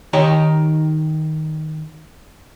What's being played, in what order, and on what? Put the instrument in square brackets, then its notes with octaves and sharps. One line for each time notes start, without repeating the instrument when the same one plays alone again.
[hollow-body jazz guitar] D#3 D#4 G4 C#5